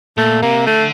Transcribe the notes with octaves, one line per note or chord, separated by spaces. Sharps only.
A#2 A3
C3 A#3
D3 A3